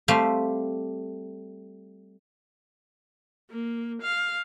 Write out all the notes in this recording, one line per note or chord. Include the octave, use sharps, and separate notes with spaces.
G3 A3 C4 G4 E5 F5
A#3
F5